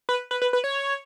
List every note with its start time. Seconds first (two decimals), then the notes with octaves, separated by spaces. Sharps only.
0.09 B4
0.31 B4
0.42 B4
0.53 B4
0.64 C#5